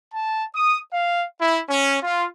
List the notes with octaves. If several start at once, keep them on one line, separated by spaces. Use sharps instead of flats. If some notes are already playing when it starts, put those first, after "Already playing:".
A5
D#6
F5
E4
C#4
F4